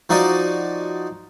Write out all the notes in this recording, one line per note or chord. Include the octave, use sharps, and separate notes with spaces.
F3 D#4 F#4 D5 D#6